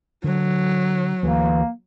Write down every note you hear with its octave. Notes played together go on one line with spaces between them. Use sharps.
D3 F#3
D2 E3 A#3